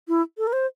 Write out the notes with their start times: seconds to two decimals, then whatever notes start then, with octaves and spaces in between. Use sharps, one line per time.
0.08 E4
0.38 A4
0.47 A#4
0.53 C5